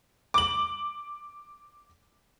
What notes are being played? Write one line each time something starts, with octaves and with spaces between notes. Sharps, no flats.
D6 F#7